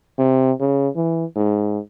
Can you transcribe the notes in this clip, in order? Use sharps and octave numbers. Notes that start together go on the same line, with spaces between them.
C3
C#3
E3
G#2